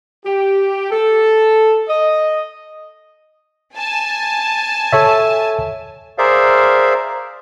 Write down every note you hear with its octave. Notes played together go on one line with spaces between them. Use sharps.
G4
A4
D#5
G#5 A5
A4 C#5 E5
G#4 A#4 C5 D5 E5 F5